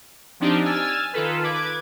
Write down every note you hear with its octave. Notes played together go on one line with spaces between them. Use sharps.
F3 C4 D4 D#4 G4
G#5 E6 F6 G#6 A6
D#3 F4 A4 B4
B4 D6 G#6